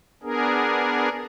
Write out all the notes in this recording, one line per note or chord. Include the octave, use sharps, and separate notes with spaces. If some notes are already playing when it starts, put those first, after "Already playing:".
B3 D4 G#4 A#4